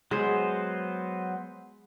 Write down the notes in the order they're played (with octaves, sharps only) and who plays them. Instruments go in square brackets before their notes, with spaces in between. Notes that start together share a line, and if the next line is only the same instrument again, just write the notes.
[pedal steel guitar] F#3 B3 C5 [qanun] G#3